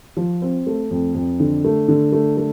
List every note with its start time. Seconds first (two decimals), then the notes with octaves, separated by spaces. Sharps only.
0.17 F3
0.42 C4
0.67 A3
0.91 F2
1.14 F2
1.40 D3
1.64 A3
1.88 D3
2.12 A3
2.37 A3